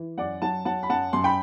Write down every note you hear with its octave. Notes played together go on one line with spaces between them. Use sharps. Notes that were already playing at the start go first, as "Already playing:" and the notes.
Already playing: E3
F#2 D5 F#5
F#3 F#5 A5
F#3 F#5 A5
B5
F#2 F#5 A5
F#2 C6
G5 B5